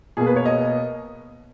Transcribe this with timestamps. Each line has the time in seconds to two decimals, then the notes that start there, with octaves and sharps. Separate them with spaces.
0.17 B2 A#3 G#4
0.27 B4
0.36 C#5
0.46 D#5